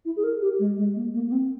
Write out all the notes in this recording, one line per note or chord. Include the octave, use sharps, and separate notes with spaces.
E4
G#4
A#4
G4
G#3
G#3
A#3
A#3
A#3
C4